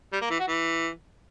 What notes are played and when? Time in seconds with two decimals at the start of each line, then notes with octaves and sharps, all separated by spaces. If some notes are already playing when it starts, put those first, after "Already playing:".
0.12 G3
0.21 A#3
0.30 E3
0.39 F#4
0.48 E3